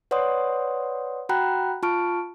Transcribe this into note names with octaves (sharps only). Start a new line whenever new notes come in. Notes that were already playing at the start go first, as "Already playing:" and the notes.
B4 C#5 D5 F#5 C6 D#6
F#4 F#5 G5 A#5 B5 F#6
F4 A5 C#6 F6 D7